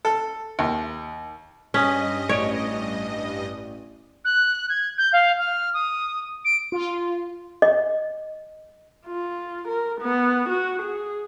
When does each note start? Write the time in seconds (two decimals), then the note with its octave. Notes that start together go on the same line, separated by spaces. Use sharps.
0.05 A4
0.59 D#2
1.74 G2 C#4 D#5 G#5 D#6 B6
2.29 A1 C#5 D5 D7
4.25 F#6
4.69 G#6
4.98 G6
5.13 F5
5.38 F6
5.73 D#6
6.45 D7
6.72 F4
7.62 D#5
9.07 F4
9.68 A#4
10.01 B3
10.49 F#4
10.82 G#4